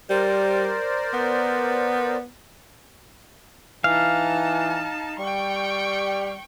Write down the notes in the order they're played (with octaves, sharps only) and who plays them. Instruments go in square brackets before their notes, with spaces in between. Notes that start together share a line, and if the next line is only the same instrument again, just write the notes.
[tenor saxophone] G3 [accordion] A#4 C5 D5
[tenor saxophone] B3
[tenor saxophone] E3 [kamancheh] D#4 A5 [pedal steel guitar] F5
[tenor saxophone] G3 [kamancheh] G5 C#6